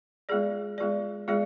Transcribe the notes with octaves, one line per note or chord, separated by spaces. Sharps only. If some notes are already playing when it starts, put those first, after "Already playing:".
G#3 B3 F4 G#4 D5
G#3 B3 F4 G#4 D5
G#3 B3 F4 G#4 D5